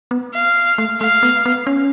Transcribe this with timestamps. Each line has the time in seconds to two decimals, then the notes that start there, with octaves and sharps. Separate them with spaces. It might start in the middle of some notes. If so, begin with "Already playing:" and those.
0.11 B3
0.34 F5
0.78 A3
1.00 A3 F5
1.23 B3
1.45 B3
1.67 C#4